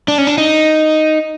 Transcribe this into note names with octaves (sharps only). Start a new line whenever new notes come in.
D4
C#4
D4
D#4